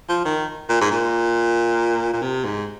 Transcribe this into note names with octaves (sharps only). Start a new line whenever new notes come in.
F3
D#3
A#2
G#2
A#2
A#2
C3
G#2